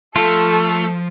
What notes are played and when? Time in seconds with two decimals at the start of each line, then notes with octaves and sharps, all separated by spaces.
0.16 F3 A3 F4 A4 A5